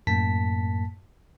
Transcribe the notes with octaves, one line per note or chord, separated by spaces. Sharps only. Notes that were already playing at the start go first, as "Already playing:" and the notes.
F#2 A2 A#3 A5 B6